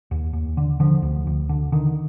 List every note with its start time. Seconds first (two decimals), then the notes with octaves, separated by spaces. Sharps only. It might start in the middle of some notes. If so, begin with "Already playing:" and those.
0.11 D#2
0.33 D#2
0.57 D3
0.80 D3 F3
1.02 D2
1.27 D2
1.49 D3
1.72 D3 D#3